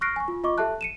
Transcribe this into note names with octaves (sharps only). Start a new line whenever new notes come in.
C#6 F6 F#6 A#6 C7 D7
G#5 C#6
F4
F4 D#5 C#6 D6
G4 A4 E5 A5 F#6
C#7 D#7 E7